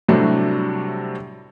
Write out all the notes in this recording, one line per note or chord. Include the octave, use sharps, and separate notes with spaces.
A2 C3 F#3 G3 A3 D4